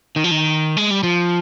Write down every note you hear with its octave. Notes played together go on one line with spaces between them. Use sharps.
D#3
F3
D#3
G#3
G3
F3